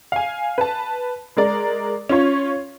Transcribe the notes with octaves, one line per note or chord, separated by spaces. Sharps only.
F5 G#5
B4 A5
G#3 A#4 D5
C#4 F4 C#5